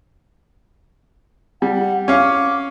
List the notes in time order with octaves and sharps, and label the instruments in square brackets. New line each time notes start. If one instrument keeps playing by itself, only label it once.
[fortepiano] G3 [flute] F#5
[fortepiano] C#4 F5 [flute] D6